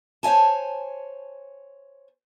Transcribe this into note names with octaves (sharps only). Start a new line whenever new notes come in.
C5 C#5 E5 G#5 A5